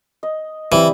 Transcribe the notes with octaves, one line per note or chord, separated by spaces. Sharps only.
D#5
E3 G3 C4 G4